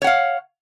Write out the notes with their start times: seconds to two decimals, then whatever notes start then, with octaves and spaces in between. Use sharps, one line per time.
0.02 C#5
0.04 F#5
0.07 F5